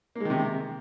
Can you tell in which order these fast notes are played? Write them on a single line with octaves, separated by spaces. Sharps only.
A#3 G#3 D#3 C3